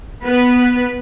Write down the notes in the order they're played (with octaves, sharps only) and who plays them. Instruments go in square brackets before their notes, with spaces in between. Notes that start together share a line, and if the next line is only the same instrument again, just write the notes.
[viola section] B3 B4